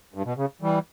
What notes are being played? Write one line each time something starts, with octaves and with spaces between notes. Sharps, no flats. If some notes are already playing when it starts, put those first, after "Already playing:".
G2
B2
C#3
E3 G3